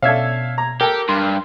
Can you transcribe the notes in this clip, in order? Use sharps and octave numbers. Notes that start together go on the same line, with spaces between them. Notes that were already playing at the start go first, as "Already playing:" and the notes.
B2 C#4 D4 A4 E5 F5 G#6
A#5
G4 A4 A#4 G5
G2 C6